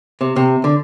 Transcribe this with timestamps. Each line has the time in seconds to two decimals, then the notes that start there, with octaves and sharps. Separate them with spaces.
0.21 C3
0.36 C3
0.64 D3